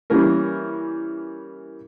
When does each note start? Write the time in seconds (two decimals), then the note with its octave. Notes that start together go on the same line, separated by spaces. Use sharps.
0.10 E3 G3 A#3 C#4 A#4